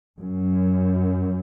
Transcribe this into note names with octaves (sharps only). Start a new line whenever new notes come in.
F#2